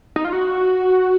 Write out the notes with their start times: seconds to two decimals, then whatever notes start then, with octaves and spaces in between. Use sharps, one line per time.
0.16 D#4
0.25 F4
0.33 F#4